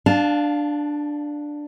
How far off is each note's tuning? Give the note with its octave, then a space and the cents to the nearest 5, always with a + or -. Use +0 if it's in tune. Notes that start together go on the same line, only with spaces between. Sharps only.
D4 +5 F5 +5 A5 -20